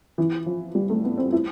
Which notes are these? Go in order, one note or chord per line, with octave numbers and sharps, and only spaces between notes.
E3
F3
G3
A3
B3
C4
E4